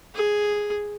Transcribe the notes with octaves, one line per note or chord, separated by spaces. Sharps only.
G#4